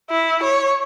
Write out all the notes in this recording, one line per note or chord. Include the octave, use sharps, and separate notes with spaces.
E4
C#5